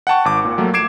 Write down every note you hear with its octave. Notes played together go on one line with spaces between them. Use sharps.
F#5 G5 A5 C#6
G#1 D6
A#2
F#3 A3 A#3
D6 G#6 C7 D7 E7